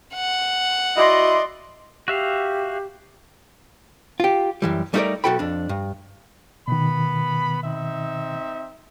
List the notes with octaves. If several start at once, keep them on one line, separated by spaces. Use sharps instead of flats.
F#5
E4 F#4 D5 D#5 C6
F#4 G4 E5 F5
F4 G4
F#2 E3 G3
G3 A3 D#4 G#4 A#4 D5
B1 F3 F#4 A4 G5 B5
F2 D4
G2
B2 D#3 B3 B5
C4 D#4 E5